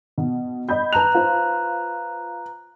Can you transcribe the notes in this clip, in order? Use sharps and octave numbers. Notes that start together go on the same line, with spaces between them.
B2
D#5 B5 G6
B4 A5 A#5 F#6 F7
F4 C5